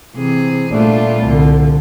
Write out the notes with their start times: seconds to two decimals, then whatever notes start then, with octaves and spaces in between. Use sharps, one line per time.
0.16 C3 E3 G#4
0.73 A#2 G3 A3 D4 F4
1.23 C2 D3